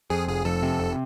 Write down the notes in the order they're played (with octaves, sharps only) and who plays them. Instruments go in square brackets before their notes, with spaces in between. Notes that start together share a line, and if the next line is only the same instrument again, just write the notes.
[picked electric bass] F2 [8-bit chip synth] G#4
[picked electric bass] F1 [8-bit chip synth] G#4
[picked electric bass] F2 [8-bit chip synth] A4
[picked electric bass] C3
F1